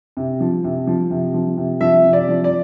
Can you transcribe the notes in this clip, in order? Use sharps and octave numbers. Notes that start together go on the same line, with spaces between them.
C3
F3
C3
F3
C3
F3
C3
F3 E5
C3
D5
F3
D5